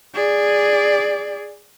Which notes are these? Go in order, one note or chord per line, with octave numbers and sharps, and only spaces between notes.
G#4 D5